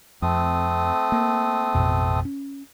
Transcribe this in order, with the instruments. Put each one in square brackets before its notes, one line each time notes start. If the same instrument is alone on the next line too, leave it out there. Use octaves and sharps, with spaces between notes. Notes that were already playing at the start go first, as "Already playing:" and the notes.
[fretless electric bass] F2 [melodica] A3 C4 D#6
[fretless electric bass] A#3
A1 F2 B2
C#4